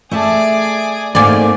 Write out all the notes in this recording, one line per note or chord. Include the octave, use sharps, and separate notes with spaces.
A3 G#4 D5 E5 A5
G#2 A3 A#3 C4 D5 G#5